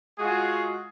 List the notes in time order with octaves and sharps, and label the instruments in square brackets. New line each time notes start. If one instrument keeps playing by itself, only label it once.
[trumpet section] G#3 F4 F#4 G#4